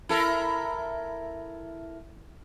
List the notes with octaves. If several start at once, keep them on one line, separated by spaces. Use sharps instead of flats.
E4 A4 A#4